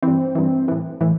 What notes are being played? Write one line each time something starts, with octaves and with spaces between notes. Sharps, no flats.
G2 E3 C4
G2 E3
A2 E3
A2 E3